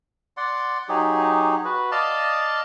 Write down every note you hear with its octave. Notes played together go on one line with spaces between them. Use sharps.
D5 F#5 C6
F#3 D#4 G4 G#4
F#4 B4
D5 D#5 F5 A5